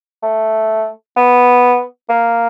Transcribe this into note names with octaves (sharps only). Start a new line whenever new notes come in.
A3
B3
A#3